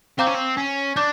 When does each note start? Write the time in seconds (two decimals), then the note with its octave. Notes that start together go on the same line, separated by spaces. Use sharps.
0.19 C4 C5 F5 A#5 D6 G6
0.27 C#4
0.35 C4
0.57 C#4
0.96 D4 D6 G6